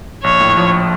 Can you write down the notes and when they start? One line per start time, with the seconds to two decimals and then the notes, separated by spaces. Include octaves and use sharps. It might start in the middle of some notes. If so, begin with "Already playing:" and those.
0.24 A#1 C#5
0.40 A2
0.57 F3